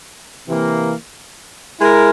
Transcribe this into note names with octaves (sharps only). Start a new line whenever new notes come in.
C3 E3 A#3
G#3 E4 A#4